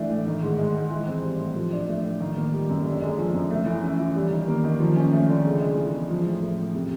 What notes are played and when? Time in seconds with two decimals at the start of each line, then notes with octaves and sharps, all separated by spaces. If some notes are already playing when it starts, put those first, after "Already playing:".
Already playing: E3 A3 D4
0.10 A2
0.26 D#3
0.43 G#2
0.58 G#3
0.75 G#2
0.91 E3
1.07 C4
1.24 G3
1.40 A2
1.56 F3
1.73 D4
1.88 A3
2.04 A2
2.20 D#3
2.37 A#3
2.53 G3
2.70 F#2
2.86 D3
3.02 G#3
3.18 F3
3.34 F#2
3.51 A3
3.66 E3
3.83 C#4
3.99 E3
4.15 G3
4.31 D#3
4.48 A#3
4.64 D#3
4.80 F3
4.96 C#4
5.12 A3
5.29 D3
5.45 C#3
5.61 G#3
5.77 E3
5.93 E2
6.10 F3
6.25 A2
6.42 A3
6.58 A2
6.75 C3